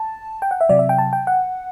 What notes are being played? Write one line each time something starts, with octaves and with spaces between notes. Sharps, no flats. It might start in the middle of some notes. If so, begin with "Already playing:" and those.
Already playing: A5
G5
F#5
E5
C3 F#3 D5
E5
G5
A5
G5
F#5